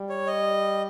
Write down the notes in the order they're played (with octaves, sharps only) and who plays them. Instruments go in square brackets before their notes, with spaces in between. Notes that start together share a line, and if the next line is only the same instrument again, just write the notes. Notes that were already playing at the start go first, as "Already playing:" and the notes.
Already playing: [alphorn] G3
[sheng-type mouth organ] C#5
D#5